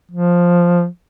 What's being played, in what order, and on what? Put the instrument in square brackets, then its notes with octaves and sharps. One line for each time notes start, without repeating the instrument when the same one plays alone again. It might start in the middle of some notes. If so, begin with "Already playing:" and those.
[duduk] F3